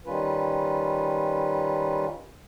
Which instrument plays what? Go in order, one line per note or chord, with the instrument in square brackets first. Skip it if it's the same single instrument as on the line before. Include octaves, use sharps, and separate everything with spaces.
[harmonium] D#3 G3 C#4 F4 B4